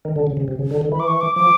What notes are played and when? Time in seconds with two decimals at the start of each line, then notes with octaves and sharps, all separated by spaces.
0.05 D#3
0.16 D3
0.27 C#3
0.37 C#3
0.48 C3
0.59 C#3
0.71 D3
0.81 D3
0.92 E3 B5
1.00 D6
1.07 C#6
1.21 D6
1.36 F3 D6